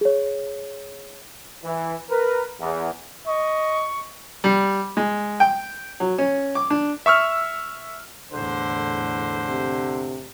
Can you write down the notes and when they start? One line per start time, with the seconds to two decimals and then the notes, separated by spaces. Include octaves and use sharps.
0.01 G#4 C#5
1.63 E3
2.10 A#4 B4
2.60 E2
3.27 D#5 C#6
4.44 G3
4.97 G#3
5.40 G5
6.00 F#3
6.18 C#4
6.55 D6
6.70 D4
7.06 E5 C#6 E6 F6
8.32 E2 A2 D3 C5
9.48 C3